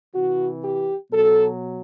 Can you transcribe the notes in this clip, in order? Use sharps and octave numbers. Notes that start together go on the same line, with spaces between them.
C3 E3 F#4
G4
B2 F#3 A4